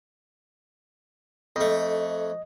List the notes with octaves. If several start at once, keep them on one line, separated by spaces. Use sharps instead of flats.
F2 A3 D#5